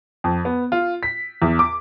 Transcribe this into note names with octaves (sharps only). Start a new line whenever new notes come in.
F2
B3
F4
B6
E2
D6